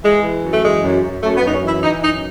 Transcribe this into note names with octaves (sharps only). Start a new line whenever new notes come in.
E3 G#3
E3
F#2
A3
E3 G#3
F#2
F#2
F#2 A3
B3
F#2 D#4
C#4
E3 E4
E3 D#4
F#2 D#4